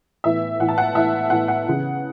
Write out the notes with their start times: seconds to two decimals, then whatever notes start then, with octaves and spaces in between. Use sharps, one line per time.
0.24 A2 E3 B3 E5
0.59 A2 E3 B3 F#5
0.68 A5
0.78 F#5
0.95 A2 E3 B3 E5
1.30 A2 E3 B3 F#5
1.48 F#5
1.65 C#3 E3 B3